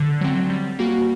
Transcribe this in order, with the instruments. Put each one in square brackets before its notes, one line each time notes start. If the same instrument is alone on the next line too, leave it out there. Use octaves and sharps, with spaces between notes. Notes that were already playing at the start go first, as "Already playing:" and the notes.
Already playing: [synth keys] D3
F#3 C4
G3
A#3 F#4